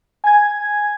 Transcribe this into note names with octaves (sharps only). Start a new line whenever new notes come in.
G#5 G#6